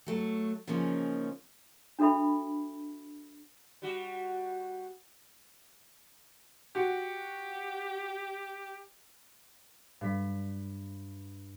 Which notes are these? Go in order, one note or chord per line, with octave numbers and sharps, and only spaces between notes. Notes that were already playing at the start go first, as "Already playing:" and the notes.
F#3 A3
C#3 F3 A#3 C#4 D#4
D4 F#4 A4 E5 B5
G3 F#4
F#4 G4
G2 B6